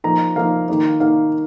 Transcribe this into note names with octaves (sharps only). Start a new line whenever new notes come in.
F3 A#3 D#4 A#5
F3 A#3 D#4 F5
D#3 A#3 D#4
D#3 A#3 D#4 F5